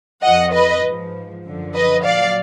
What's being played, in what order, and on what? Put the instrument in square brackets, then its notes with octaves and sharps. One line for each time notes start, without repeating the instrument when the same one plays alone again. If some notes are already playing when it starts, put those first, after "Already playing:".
[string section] F2 F3 D#5 F#5
B4 D#5
G#2 F3
F#2 D3 F3
B4 D#5
A#2 F#3 D5 F5